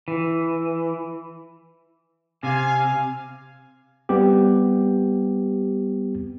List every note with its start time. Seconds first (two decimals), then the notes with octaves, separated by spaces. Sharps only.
0.08 E3
2.43 C3 F5 G#5
4.09 G3 B3 C4 G4